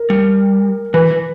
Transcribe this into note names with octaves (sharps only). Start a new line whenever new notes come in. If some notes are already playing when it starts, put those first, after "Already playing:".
Already playing: A#4
G3
E3 B4
E3